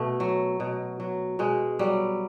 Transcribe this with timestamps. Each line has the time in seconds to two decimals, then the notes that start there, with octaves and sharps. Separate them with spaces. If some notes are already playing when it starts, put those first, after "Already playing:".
Already playing: B2 A3
0.20 F#3
0.60 B2
1.00 F#3
1.39 B2 G#3
1.79 F#3 G3